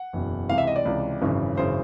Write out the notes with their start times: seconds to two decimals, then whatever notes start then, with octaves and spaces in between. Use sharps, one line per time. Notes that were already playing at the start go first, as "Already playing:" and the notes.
Already playing: F#5
0.13 F#1 E2 B2
0.49 C#2 C3 E3 F5
0.58 E5
0.67 D#5
0.76 D5
0.85 C#2 C3 E3
1.21 G#1 F#2 C#3 E3
1.57 G#1 F#2 C#3 E3 C5